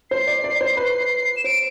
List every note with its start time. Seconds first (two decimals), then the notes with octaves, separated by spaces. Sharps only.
0.10 C5 C7
0.27 D5
0.44 D5
0.61 C5
0.77 B4
1.36 E7
1.44 C5 D7